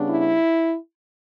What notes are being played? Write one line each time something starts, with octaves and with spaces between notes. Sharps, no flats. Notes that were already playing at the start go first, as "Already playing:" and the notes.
Already playing: C#3 G3 B3 D4
E4